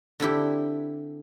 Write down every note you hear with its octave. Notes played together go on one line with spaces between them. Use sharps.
D3 C4 E4 G4